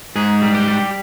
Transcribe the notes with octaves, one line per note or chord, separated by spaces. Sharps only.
G#2 G#4
G3
G4
G3